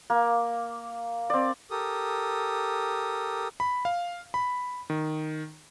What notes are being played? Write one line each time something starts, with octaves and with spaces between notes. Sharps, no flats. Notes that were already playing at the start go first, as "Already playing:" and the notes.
A#3
C4 D5
G4 A4 A#4 D#6
B5
F5
B5
D#3